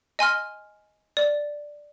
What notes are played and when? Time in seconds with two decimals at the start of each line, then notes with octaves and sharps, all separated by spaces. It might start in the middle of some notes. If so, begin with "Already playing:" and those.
0.19 D#5 G#5 C6 F6
1.17 D5